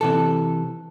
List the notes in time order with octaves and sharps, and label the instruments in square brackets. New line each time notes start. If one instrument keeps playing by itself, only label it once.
[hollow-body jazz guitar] C3 E3 A4